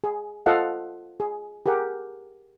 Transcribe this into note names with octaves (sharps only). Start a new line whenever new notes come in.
G#4
F4 A4 C5 D#5 F5 F#5
G#4
G4 G#4 A#4 F#5